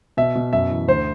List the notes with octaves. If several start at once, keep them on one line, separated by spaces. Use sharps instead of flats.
B2 E5
B2
F#2 E5
E3
D2 C5